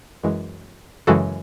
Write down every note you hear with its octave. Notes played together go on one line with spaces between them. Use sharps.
F#2 E3 G#3
F#2 C#3 E3 G#3 F#4 A4